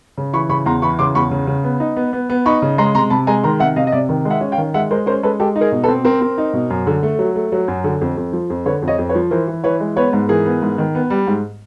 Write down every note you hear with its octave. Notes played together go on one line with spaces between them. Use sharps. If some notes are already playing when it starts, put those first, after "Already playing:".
C#3
E3 B5 C#6
C#3 B5 C#6
E2 A#5 C6
E3 B5 C#6
C#3 C6 D6
E2 B5 C#6
C#3
C#3
B3
D#4
B3
B3
B3
D#4 B5 C#6
C#3
G#3 A#5 C6
C3 A#5 C6
C3 A5 B5
G#3 G#5 A#5
D#3 A#5 C6
C3 E5 F#5
C3 D#5 F5
D#5
C3 D5 E5
D#3
G#3
E5 F#5
C#4
F5 G5
D#3
G#3 E5 F#5
G#3 A#4 C5
C#4 A#4 C5
G#3 A4 B4
G#3 G4 A4
D#4
G#4 A#4
B2
A4 B4
C4
C4 A#4 C5
C4
D#4
B2
F#2
D3
A3
F#3
A3
F#3
F#2
D3
F2
F2
F3
F2
D3 B4 C#5
F2
C#5 D#5
F2
B4 C#5
F3
E3 A#4 C5
E3
E3 B4 C#5
G#3
B3 B4 C#5
G#2
E3 G#4 A#4
B3
G#2
D#3
B3
G3
G#2